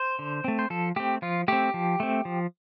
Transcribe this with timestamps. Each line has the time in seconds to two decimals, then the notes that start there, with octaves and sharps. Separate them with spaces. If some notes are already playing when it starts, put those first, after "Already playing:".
Already playing: C5
0.19 D3
0.44 A3 C4
0.59 C5
0.70 F3 A4
0.96 A3 C4 G4
1.22 F3 F4
1.48 A3 C4 G4
1.74 F3
2.00 A3 C4
2.25 F3